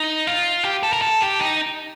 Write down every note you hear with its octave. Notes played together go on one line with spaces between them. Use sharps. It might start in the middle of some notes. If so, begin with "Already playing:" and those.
Already playing: D#4
F4
G4
A4
A#4
A4
G4
D#4